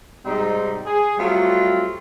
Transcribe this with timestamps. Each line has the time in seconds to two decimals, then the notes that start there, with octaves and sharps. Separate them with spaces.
0.24 G#2 C3 G3 C4 D#4
0.85 G#4
1.17 F#3 G3 A3 C4 F4